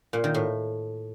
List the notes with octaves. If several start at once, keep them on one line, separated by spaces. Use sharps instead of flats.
A#2
D#3
A2